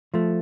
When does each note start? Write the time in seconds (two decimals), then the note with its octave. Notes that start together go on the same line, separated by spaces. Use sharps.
0.14 F3 A3